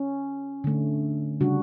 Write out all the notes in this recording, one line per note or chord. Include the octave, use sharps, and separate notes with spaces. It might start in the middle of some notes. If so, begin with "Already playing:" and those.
Already playing: C#4
D3 A3
C#3 G3 D4 F#4